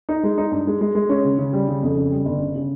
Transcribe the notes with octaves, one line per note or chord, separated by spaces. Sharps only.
D#4
G#3
D#4
G2
G#3
G#3
G#3
C#4
C#3
C#3
G3
C#3
F2
C#3
G3
G1
C#3
C#3